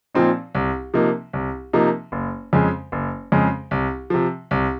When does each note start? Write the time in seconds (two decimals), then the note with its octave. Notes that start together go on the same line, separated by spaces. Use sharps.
0.14 A#2 F3 C4 D#4
0.55 C2
0.94 C3 F3 A#3 D#4
1.33 C2
1.73 C3 F3 A#3 D#4
2.12 F#1
2.53 F2 C#3 G#3
2.92 F#1
3.32 F2 C#3 G#3
3.71 C2
4.10 C3 F3
4.51 C2